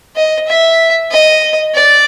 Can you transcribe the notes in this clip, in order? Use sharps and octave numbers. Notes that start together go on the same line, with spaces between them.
D#5
E5
D#5
D5